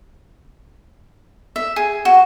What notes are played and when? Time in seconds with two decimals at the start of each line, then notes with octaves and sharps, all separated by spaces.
1.56 E5
1.76 G#4
2.05 F#4